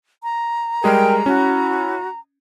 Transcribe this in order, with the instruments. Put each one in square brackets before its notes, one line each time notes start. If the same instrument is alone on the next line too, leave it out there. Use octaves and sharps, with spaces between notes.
[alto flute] A#5
[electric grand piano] G3 G#3 G#4 [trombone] A#4 [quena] G5
[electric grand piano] C#4 [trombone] E4 [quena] F#4